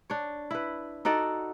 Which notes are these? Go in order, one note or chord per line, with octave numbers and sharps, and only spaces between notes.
D4 C#5
E4 B4
D#4 F#4 A4 D5